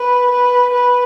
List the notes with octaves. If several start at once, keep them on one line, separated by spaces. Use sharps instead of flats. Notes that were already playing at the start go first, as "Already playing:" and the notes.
Already playing: B4
B4
B4